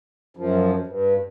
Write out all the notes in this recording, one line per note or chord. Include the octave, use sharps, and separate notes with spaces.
F#2 F3
G2